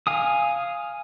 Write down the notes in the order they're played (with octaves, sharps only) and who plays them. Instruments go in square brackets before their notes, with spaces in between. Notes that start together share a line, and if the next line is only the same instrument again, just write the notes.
[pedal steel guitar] F5 G#5 D#6